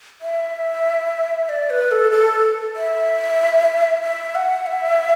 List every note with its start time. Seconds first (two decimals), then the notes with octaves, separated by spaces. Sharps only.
0.21 E5
1.49 D5
1.70 B4
1.91 A4
2.12 A4
2.76 E5
4.02 E5
4.35 F#5
4.66 E5